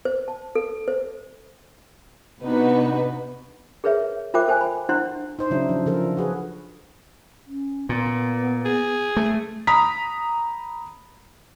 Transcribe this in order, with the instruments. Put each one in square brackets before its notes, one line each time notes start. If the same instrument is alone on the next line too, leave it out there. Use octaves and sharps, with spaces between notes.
[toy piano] C5
A5
A4
C5
[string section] C3 B3 D4 D#4 F#4 B4
[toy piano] G#4 A#4 B4 C#5 E5
F4 A#4 C5 E5 G5 D6
A4 C5 G5 G#5
B5
D4 E4 C5 F#5 C6
[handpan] D#4 C5
C#3 F#3 D4 E4
F3
D3 F3 A4 A#4
F#4 G#4 B4
[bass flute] C#4
[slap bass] A#2 [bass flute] B3
[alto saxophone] G#4
[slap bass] A3
[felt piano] A#5 B5 D#6 B6